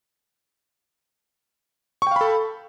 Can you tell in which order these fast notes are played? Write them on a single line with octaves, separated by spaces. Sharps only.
C#6 G5 F5 B5 A4